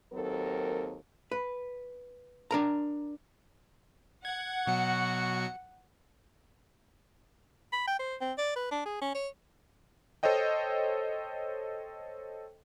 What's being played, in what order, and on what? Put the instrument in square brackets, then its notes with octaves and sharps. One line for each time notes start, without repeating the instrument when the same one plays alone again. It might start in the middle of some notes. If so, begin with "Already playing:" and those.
[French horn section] D#2 F#3 C4 A4 A#4
[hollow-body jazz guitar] B4
D4 A#4 A#5
[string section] F#5 [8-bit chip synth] G#6
[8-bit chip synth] B2 F#3 C#7 [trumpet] F#4
[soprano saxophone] B5
G5
C5
C4
D5
B4
D4
G#4
C#4
C#5
[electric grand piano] A4 C5 C#5 D#5 G5